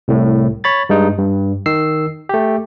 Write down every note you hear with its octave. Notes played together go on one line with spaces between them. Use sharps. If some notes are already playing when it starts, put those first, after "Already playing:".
C2 A2
C#5 B5 A6
G2 G#3 D#4
G2
D#3 E6 C7
A3 G4